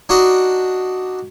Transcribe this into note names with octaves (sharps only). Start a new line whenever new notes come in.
D4 D#4 F#4